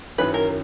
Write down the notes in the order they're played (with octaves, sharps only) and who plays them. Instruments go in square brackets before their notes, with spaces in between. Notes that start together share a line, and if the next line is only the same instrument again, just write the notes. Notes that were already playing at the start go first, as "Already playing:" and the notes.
[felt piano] F#2 D#3 F#3 C#4 E4 [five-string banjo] B4
[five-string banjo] A#4